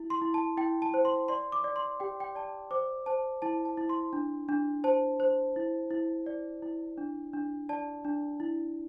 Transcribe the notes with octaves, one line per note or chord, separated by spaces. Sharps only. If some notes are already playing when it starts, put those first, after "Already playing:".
Already playing: E4
C6
E4
A5
E4 G5
A5
C5
C6
D5 C6
D6
D5
C6
G4 G5
G5
D5 A5
C5 D6
C5 A5
E4 A5
A5
E4
C6
D4
D4
C5 A5
C5
E4
E4
D5
E4
D4
D4
D5 A5
D4
E4